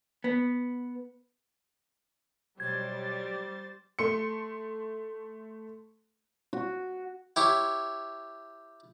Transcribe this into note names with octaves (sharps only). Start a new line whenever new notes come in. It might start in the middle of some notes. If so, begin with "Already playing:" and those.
B3
B2 F#3 G3 C5 G#6 A6
A3 C6 C#7
F#4
E4 G4 C#5